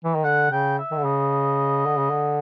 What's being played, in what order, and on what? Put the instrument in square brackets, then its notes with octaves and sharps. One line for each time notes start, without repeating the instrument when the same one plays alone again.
[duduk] E3
D#3
[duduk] D3 [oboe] F#5
[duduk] C#3 [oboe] G5
[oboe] E5
[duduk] D#3
D3
[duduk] C#3 [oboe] D#5
[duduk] D3
C#3
D3